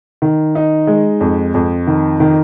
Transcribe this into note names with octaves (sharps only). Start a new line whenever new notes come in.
D#3
D#4
G#3
F2
F2
D#3
D#3